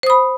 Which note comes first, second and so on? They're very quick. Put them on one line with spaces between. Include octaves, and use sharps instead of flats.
C5 D#6 B5